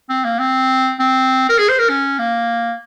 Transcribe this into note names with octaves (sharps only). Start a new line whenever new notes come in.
C4
A#3
C4
C4
A#4
G#4
C5
A#4
C#4
A#3